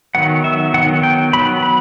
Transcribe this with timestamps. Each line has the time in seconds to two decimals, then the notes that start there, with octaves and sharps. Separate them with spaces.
0.15 D#3 F#3 B3 F#5
0.44 E5
0.74 D#3 F#3 B3 F#5
1.03 G5
1.33 F#3 B5
1.37 B3
1.63 B5